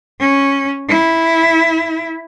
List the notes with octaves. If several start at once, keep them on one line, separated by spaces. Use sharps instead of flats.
C#4
E4